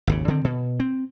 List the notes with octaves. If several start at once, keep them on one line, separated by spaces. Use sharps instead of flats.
G#1 D#2 C#3
D3 D#3 C4
B2
C4